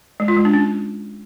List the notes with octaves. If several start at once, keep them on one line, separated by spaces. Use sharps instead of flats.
G#3
F4
G#3
D4
C#4